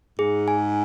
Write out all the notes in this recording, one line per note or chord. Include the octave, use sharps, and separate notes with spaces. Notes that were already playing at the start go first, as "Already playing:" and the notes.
G#2 G#4
G#5